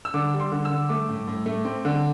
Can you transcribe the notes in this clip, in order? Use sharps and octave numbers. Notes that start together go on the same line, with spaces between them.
E6
D3 D6
G3
C6
D3
E6
D3
A3 D6
A2
A2
A3
C4
D3